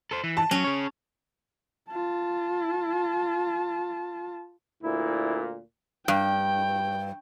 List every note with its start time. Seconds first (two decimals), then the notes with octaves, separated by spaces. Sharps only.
0.11 A4 C5
0.24 E3
0.37 A5
0.51 F#3 C#4
0.64 G#4 C#5
1.89 F4 A5
4.83 D2 A#2 E4
6.08 G2 G5